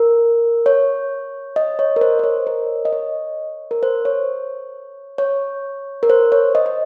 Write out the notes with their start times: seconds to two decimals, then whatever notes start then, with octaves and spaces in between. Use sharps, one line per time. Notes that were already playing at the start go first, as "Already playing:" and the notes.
Already playing: A#4
0.66 C#5
1.56 D#5
1.79 C#5
1.96 A#4
2.01 C5
2.19 D#5
2.24 C#5
2.47 A#4
2.85 D#5
2.92 C#5
3.71 A#4
3.83 C5
4.05 C#5
5.18 C#5
6.03 A#4
6.10 C5
6.32 C#5
6.55 D#5
6.66 D#5